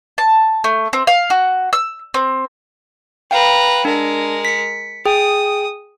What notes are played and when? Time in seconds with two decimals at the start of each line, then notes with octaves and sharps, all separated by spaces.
0.18 A5
0.64 A3
0.93 C4
1.07 F5
1.30 F#4
1.73 E6
2.14 C4
3.31 B4 F5 G5 A#5
3.85 G#3 D4 A#4
4.45 B6 C#7
5.06 G#4 G5 D#6